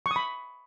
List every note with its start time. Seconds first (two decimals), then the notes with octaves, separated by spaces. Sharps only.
0.06 C#6
0.11 D#6
0.16 B5